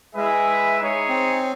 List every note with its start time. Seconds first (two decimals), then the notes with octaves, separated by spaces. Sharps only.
0.15 G#3 E4 G#4 B4 E5
0.78 D#4 G#4 C#5
1.09 C4